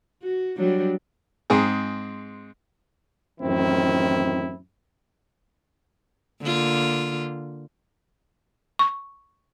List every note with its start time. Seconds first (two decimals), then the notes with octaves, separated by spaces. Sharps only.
0.22 F#4
0.58 F#3 G3 D4
1.50 G#2 C4 G#4
3.41 A1 F#2 D#3 C4 E4
6.41 D3 A#3 F4
8.79 C#6